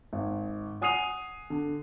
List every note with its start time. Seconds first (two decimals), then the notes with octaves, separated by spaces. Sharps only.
0.13 G#1
0.81 F#5 G#5 D#6 C7 D#7 F7
1.50 D3